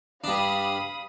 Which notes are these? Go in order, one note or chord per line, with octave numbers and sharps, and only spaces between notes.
G2 D4 F5 B5 D#6